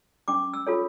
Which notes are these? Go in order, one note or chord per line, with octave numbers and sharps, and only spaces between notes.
C#4 D6
E6
F4 A4 C#5